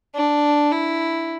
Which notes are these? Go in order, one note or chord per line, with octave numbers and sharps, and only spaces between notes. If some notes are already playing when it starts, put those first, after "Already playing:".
D4
E4